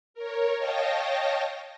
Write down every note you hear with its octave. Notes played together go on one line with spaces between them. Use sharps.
A#4 C#5
C#5 D#5 F5 G5 A5 A#6